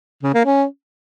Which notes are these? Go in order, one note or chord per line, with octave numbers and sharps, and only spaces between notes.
C#3
A#3
C#4